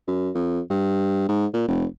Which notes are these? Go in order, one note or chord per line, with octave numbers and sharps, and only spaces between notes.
F#2
F2
G2
G#2
A#2
F1